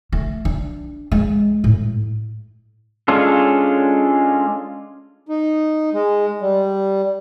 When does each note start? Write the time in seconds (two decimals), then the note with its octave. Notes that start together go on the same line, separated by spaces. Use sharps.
0.12 A3
0.45 D4
1.12 G#3
1.64 A2
3.08 G#3 C#4 D4 F4 A4
5.29 D#4
5.94 G#3
6.42 G3